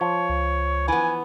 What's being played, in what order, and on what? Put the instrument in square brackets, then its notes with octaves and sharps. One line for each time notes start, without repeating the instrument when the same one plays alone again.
[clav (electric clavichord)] F3 [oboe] C#5
[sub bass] C#2
[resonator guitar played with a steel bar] E3 B3 [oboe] G#5